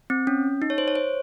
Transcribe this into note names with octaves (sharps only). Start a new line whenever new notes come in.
C4
C#4
D#4
C#5
C5
C#5
C5